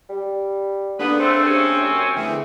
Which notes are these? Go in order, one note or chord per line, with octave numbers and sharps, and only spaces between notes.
G3
D3 A#3 B3 D4 G#4 B4
A3 C4 C5
C3 C#4
F#2
D3 E3 A3 G#4